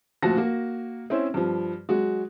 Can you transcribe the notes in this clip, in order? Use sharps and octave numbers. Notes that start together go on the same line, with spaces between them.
D2 A#2 F3 F#4 A5 A#6
A#3 F#4
C4 C#4 E4 C5
G2 F3
F#3 G#3 F#4